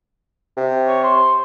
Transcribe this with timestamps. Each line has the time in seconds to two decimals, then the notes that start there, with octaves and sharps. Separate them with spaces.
0.57 C3
0.88 C#5
1.04 C5